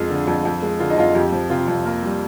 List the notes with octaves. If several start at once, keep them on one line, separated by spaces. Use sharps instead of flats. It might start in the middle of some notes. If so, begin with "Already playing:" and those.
Already playing: F2 G#3 F4
D3
F2
F2
G#3
D3 F4
D#4
F2 F4
F2 G4
F3
C3 F4
F2
A#3
G3